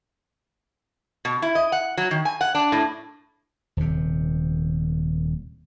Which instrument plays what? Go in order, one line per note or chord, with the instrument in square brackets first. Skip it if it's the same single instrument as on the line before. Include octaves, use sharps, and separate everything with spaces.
[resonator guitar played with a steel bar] B2
E4
D#5
F#5
F#3
D#3
G#5
F#5
D4
A2
[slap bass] D#1 C3